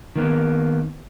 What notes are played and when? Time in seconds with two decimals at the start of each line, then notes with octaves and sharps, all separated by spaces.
0.16 D#3 A#3 B3